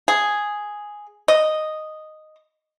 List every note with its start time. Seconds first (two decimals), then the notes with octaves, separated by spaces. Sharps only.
0.08 G#4
1.28 D#5